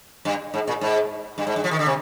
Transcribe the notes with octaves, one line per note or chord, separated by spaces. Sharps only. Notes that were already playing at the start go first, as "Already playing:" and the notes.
G2
G#2
A#2
G#2
G2
G#2
G2
F3
D#3
D3
C3